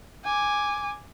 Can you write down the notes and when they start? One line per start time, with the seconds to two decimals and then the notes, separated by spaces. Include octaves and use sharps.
0.24 G#5 D6